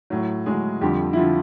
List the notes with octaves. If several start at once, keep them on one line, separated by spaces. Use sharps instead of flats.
A2 F#3
A2 F#3 G#3 G#4
F2 D3 F3 G3 G4
E4
D3 F3 F4